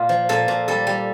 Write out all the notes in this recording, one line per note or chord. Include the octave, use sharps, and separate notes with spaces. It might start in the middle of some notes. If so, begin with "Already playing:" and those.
Already playing: A#2 F4
F3
A#2 A4
A#2
G3 A4
G3